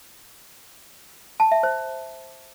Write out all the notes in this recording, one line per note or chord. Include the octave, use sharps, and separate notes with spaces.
A5
E5
C5